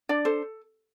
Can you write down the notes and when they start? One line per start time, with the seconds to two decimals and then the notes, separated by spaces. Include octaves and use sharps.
0.09 D4 D5
0.25 A4 C5